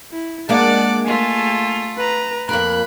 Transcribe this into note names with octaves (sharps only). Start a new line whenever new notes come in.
E4
G#3 A#3 D4 D5 F#5 A5 D6
A3 F4 G#5
B4 A#5
F2 A#3 A#4 B5 F#6